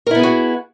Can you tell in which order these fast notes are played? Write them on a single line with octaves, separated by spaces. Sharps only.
A#4 E4 B3 G#4 F#4